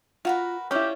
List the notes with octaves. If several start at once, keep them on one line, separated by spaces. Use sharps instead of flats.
F4 F#4 A#4 B4
C#4 E4 F4 G4 D5